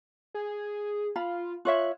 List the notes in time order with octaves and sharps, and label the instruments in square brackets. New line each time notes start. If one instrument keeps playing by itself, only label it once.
[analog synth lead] G#4
[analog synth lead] F4 [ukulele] F5 B5
[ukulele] F4 C#5 E5 [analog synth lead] F#6